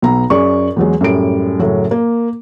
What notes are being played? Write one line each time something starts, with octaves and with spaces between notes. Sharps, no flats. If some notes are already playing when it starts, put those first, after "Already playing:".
B1 B3 A#5
F#2 G#4 D5 C#6
E2 F#3 G#3
F#2 A2 G3 D7
F#2 A2 C#3 F#3
A#3